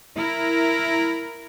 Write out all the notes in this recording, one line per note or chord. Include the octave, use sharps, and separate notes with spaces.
E4 A#4